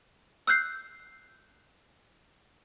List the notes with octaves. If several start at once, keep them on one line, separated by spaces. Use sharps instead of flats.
E6 F#6 G6 C7